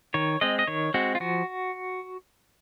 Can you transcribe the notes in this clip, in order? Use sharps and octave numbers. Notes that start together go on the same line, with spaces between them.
D#3 C#5
G#3 C4 D#5
D#5
D#3 C#5
G#3 C4 F#4
F4
F3 F#4